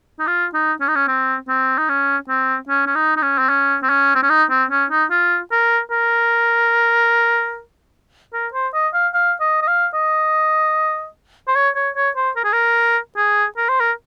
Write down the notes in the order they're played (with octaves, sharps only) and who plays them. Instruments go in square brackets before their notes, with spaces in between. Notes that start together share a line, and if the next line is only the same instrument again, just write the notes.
[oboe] D#4
F4
D#4
C#4
D#4
C#4
C4
C4
D#4
C#4
C4
C#4
C#4
D#4
D#4
C#4
C4
C#4
C4
C#4
C4
C#4
D#4
C4
C#4
D#4
F4
A#4
A#4
A#4
C5
D#5
F5
F5
D#5
D#5
F5
D#5
C5
C#5
C#5
C#5
C5
A#4
G#4
A#4
G#4
A#4
C5
A#4